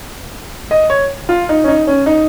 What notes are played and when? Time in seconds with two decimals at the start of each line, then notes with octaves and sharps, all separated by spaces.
0.71 D#5
0.90 C#5
1.29 F4
1.49 D#4
1.64 C#4
1.68 D#4
1.87 C#4
2.06 D#4